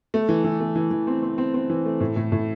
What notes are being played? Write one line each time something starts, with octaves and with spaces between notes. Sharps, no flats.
A3
E3
E3
A3
E3
E3
C4
C4
C4
C4
E3
A3
A2
A2
A2